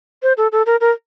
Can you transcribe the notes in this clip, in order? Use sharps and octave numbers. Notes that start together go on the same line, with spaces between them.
C5
A4
A4
A#4
A#4